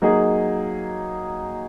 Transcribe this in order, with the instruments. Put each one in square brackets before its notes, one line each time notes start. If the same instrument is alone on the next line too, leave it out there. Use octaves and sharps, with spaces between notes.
[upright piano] F#3 A#3 D#4 G#4 D#5